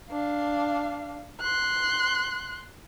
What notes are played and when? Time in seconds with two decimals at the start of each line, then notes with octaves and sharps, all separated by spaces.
0.11 D4 F5
1.41 C6 F#6